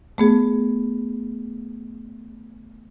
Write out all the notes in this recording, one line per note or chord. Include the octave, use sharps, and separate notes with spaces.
A3 B3 G#4